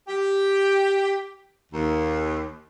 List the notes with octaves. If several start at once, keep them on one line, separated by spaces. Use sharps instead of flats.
G4
D#2